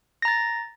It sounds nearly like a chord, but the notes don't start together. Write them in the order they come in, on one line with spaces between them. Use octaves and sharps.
A#6 A#5 A6